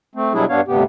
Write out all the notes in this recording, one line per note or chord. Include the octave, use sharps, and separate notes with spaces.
A3 C4
B2 F#3 G3 D4 E4 G#4
G2 B3 D4 C#5 F5
D2 G2 C3 B3 G4